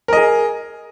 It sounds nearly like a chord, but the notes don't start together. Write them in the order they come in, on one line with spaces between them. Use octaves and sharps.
A#4 D#5 G#4